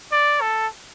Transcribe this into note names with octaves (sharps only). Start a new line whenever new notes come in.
D5
A4